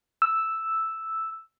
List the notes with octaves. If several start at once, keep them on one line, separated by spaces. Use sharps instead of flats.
E6